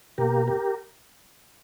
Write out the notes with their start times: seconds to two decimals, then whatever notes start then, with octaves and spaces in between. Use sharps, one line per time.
0.18 B2 A#3 G4 A#4
0.48 G4 A#4